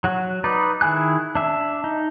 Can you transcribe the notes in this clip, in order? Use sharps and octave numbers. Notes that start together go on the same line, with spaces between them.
F#3 F#4
D#4 B4 D5
D#3 E4 G#4 G#5 F#6
D4 E5
D#4